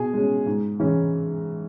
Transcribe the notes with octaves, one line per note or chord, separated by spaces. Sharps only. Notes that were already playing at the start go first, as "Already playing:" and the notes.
Already playing: B2 G#4 G#5
G#3 C#4
G#2
E3 G#3 C#4